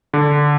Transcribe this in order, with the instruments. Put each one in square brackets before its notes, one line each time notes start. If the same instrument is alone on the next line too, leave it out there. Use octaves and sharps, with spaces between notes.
[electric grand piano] D3